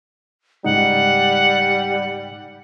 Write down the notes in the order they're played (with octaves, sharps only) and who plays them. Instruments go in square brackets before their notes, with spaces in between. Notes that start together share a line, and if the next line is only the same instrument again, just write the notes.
[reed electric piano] C#2 G#2 D#4 [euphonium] G3 [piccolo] F#5